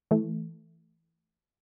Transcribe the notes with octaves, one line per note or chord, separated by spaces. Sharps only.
E3 A3